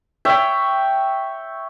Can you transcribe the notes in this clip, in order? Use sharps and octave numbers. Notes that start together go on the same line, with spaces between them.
C#5 E5 G5